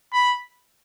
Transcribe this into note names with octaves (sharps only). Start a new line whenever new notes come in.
B5